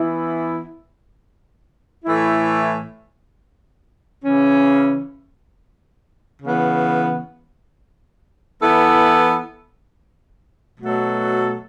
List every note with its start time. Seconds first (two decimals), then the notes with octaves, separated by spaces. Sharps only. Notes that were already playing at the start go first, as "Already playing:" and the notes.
Already playing: E3 B3 E4
2.05 A2 E3 A3 E4
4.24 C#3 E3 C#4
6.42 C#3 E3 B3
8.61 E3 B3 E4 A4
10.80 B2 F#3 A3 F#4 A4